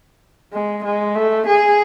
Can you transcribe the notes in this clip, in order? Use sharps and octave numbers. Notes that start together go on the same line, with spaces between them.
G#3
G#3
A3
G#4